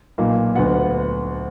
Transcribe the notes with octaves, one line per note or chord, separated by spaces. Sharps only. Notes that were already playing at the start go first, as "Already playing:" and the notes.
B1 A#2 A#3
D2 D3 F#3 B3 F#5